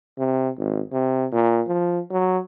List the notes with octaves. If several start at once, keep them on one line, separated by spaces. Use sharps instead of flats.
C3
G#1
C3
A#2
F3
F#3